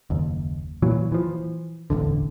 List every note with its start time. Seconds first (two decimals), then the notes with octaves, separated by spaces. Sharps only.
0.10 F#1 D#2
0.82 A#2 E3 F#3
1.12 E3 F3
1.90 E1 A1 E2 D3